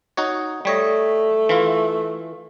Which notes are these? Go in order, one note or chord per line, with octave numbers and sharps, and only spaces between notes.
D#4 F#4 C#5
G3 A3 C#5 D#5
E3 E4 F4